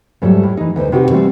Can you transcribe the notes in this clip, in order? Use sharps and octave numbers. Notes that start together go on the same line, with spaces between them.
G#2 D3 F#3 G3 A3
A2
E3 D#4
D2 D#4 B4 C5
C3 D#4 F#4 G4 A4 B4
D3 E3 F#3 G3 A3 C4